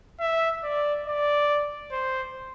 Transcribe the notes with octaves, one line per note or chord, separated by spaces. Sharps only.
E5
D5
D5
C5